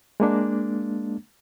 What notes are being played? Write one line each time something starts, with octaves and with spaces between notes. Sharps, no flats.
G#3 A#3 D4